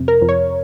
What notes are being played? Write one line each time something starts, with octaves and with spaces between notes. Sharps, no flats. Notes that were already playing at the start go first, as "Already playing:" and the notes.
Already playing: F2 C3
A#4
F2
C#5